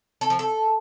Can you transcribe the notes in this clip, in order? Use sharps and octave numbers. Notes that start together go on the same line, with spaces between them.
A4
F3
A4